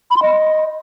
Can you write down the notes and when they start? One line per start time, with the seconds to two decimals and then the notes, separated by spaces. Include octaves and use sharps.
0.11 B5
0.17 C6
0.22 D#5